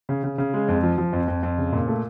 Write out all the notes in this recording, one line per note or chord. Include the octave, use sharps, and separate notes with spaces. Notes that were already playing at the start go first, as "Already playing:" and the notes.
C#3
C#3
C#3
G#3
F2
F3
F3
F2
F2
F2
C#3
A#2
A3